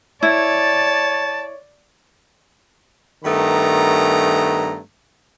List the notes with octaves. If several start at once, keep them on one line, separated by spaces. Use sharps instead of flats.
E4 C#5 D5 A5
G2 D#3 A3 B3 A#5